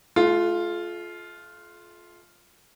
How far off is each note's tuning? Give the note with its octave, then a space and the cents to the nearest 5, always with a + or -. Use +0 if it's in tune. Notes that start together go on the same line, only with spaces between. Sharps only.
A3 -40 F4 +0